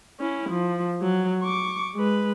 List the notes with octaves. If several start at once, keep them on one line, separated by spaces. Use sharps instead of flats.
C#4 E4
F3
F#3
C#6 D6
G#3 B4